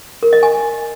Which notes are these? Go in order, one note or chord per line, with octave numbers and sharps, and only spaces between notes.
A#4
D#5
G#5